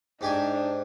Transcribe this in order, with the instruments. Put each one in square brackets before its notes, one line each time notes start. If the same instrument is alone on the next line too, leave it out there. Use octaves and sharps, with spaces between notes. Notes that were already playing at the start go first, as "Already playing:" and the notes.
[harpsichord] G#2 G4 G#5 [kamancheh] D4 D#4